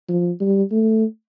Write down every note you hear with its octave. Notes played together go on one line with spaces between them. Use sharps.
F3
G3
A3